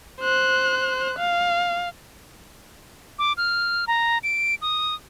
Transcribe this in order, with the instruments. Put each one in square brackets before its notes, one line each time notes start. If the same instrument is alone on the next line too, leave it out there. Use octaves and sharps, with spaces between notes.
[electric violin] C5 F#6
F5
[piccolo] D6
F6
A#5
D7
D#6